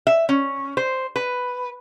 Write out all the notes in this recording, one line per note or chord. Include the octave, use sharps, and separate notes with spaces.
E5
C#4
C5
B4